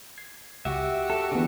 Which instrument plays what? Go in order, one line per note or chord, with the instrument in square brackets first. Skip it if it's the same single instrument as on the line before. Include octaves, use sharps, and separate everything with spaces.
[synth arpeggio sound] G#6 C7
[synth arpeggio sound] C#2 [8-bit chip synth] F#4 G4 F#5 [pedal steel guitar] E5
[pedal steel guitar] A4
[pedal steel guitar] D3 E3 [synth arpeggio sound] B3 G#4